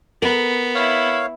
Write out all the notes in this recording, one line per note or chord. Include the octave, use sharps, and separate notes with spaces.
B3 A#4
E4 C#5 F5